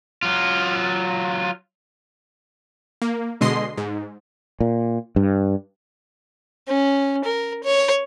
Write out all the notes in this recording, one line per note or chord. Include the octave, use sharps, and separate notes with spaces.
F#3 F4
A#3
B2 D3 G#3 D#5 C6 C7
G#2
A#2
G2
C#4
A#4
C#5